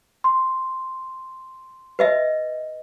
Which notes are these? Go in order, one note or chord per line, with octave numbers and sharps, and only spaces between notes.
C6
B4 D#5 E5